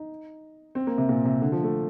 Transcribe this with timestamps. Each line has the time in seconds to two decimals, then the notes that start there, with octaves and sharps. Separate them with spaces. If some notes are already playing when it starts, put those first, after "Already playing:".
Already playing: D#4
0.75 C4
0.87 A#3
0.98 C3
1.09 A#2
1.25 C3
1.42 D3
1.52 F3
1.64 A3